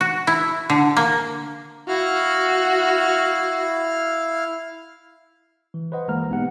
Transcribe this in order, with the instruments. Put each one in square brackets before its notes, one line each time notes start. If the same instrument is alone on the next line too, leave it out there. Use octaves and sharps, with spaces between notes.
[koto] F#4
E4
D3
A#3
[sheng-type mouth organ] E4 F5 F6 [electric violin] F#4
[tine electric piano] E3
B4 C5 D#5 F#5
G1 E3 G#3 A#3 A#5 F6
B1 B3 D#4 G4 F#5